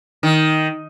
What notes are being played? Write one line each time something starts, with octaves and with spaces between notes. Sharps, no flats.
D#3